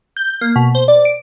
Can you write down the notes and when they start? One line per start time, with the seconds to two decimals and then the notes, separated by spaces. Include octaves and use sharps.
0.17 G6
0.41 A#3
0.56 B2
0.75 C5
0.88 D5
1.05 D7